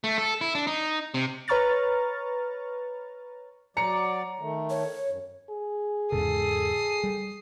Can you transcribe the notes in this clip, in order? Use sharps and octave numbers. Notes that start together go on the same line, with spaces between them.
A3
A4
E4
D4
D#4
C3
B4 C#5 A#5 C#6 F6 A6
F#3 D5 A#5 C#7
D#3 A3
C#5
F#2
G#4
E2 G#2 C#3 A4 D#6 C7
G3